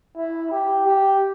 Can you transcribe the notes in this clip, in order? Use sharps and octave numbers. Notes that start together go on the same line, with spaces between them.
E4
G4
G4